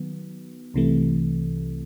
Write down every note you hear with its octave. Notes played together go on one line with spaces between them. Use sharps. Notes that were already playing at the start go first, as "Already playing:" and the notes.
Already playing: D#3 F#3 B3
C2 C3 E3 A3